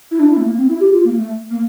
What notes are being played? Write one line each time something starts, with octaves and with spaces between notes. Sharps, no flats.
E4
D4
E4
A3
A#3
C4
E4
G4
F4
A#3
A3
A#3